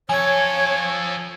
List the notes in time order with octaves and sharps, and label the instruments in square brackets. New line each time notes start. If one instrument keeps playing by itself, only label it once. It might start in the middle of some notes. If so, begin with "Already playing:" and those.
[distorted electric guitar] F3 A4 [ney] C#5 [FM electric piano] G#5 G#6